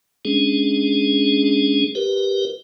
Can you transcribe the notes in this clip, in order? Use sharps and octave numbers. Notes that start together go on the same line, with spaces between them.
G#3 C#4 D4 G#4
G4 A#4 B4